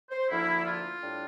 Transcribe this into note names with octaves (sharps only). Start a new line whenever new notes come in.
C5
D2 D3 F3 A#3 D4 E4
F4
A2 G3 D4